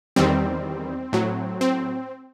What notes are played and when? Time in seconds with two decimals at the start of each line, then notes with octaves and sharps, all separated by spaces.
0.16 E2 D#3 G3 C4
1.13 A2 F#3
1.61 C4